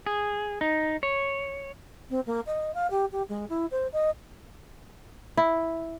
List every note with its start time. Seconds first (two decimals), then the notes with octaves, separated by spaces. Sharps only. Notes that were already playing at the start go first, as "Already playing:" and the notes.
0.06 G#4
0.61 D#4
1.03 C#5
2.10 C4
2.26 A#3
2.46 D#5
2.74 F5
2.90 G4
3.12 G4
3.28 G#3
3.49 E4
3.71 C5
3.92 D#5
5.37 E4